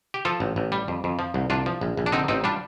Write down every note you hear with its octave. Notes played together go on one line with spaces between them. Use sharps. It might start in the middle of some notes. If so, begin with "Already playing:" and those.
G4
F3 F4 A4
A1
A1
G3
F2
F2
F3
C2
C2 D4 F4
F3
A#1
A#1
D4
D3 C4 D#4
A1 C4 D#4
G3 D4 F4